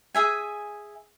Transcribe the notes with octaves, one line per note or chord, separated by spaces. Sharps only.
G#4 E5 G#5